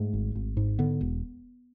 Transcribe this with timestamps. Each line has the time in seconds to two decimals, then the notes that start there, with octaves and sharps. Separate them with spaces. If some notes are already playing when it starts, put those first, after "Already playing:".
Already playing: G#2 A3
0.13 G#1
0.35 G#1
0.57 G#2
0.79 D3 B3
1.01 E1